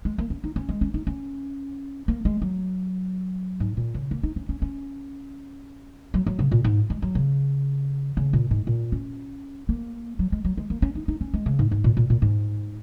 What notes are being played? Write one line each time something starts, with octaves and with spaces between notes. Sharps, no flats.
G#3
A#3
C#4
D#4
C#4
G#3
C#4
D#4
C#4
A#3
G#3
F#3
G#2
A#2
C#3
A#3
D#4
C#4
C#4
C#4
F#3
F#3
C#3
A#2
G#2
G#3
F#3
C#3
C#3
A#2
G#2
A#2
C#4
A#3
F#3
G#3
F#3
G#3
A#3
C#4
D#4
D#4
C#4
G#3
C#3
G#2
G#2
A#2
A#2
A#2
G#2